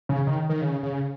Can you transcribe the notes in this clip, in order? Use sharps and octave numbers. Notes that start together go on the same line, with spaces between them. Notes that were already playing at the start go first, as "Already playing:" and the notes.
C#3
D#3
D#3
C#3
C#3